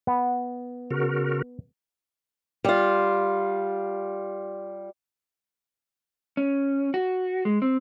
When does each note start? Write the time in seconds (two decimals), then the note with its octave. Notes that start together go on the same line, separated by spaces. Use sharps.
0.07 B3
0.91 C#3 F#4 A#4
2.65 G3 F4
6.37 C#4
6.94 F#4
7.45 G#3
7.62 C4